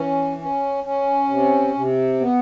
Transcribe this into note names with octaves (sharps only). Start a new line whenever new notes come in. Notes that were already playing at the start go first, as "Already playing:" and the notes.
Already playing: E3 C#4
C#4
C#4
C3
C3
B3